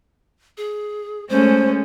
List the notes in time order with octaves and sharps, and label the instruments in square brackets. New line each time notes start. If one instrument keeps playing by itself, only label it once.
[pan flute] G#4
[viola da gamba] G#3 A3 C#4 [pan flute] C5